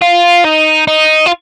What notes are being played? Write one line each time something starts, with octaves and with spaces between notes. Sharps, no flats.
F4
D#4
D#4
F4